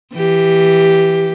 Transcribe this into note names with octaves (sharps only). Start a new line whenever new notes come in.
E3 G4